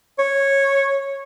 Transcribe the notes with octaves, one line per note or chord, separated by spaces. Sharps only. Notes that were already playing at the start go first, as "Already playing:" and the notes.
C#5